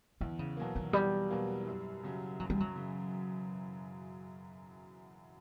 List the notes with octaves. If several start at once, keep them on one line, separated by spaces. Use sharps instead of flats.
E2 D3
C#3
B2 F#3 A#3
D#3
E2 G3
B2 F#3 A#3
F#2
C#3 F#3
F#2 F#3
G3
F#3
C#3